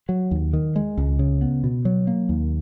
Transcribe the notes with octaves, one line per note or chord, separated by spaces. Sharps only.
F#3
D#2
D#3
G#3
C#2
C#3
B3
B2
F#3
A#3
D#2